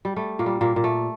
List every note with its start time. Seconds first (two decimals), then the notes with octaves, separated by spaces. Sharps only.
0.05 G3
0.16 G3 A3
0.39 A#2 A#3
0.46 G3
0.61 A#2 A#3
0.76 A#2
0.84 A3